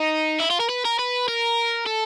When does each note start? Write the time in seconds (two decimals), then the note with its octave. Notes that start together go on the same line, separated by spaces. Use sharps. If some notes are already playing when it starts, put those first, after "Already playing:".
Already playing: D#4
0.40 E4
0.50 F4
0.60 A#4
0.69 B4
0.85 A#4
0.99 B4
1.28 A#4
1.86 A4